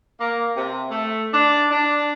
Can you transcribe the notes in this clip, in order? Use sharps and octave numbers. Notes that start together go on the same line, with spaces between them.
A#3
C3
A3
D4
D4